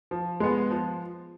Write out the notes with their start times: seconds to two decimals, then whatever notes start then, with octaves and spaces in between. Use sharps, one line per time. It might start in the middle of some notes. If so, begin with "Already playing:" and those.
0.11 F3
0.40 G#3 B3
0.70 F3